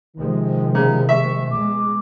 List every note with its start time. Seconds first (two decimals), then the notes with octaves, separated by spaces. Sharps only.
0.17 C3 D#3 F3 G#3
0.75 C#3 A#5
1.09 E5 C#6
1.51 B2 G#3 D6